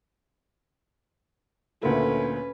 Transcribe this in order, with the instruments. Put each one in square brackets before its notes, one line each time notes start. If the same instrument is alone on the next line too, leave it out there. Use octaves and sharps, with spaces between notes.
[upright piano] D2 A#2 A3 [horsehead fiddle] C#4 B4